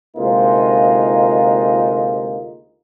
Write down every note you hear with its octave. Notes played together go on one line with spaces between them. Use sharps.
D2 C3 G#3 A#3 D#4 F4